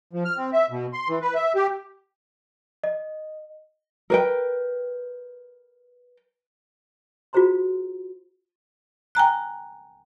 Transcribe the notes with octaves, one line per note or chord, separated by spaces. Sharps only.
F3
F6
C4
E5
B2
C6
E3
B4
E5
G4
D#5
A#4 B4 G5
F4 F#4 G#4 C5 A#5 C6
G5 G#5 A#5 F#6